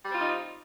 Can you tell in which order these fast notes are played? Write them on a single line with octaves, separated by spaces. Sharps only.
G3 C4 F4 D#4